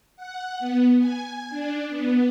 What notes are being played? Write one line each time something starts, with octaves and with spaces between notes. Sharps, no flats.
F#5
B3
G#5
D4
B3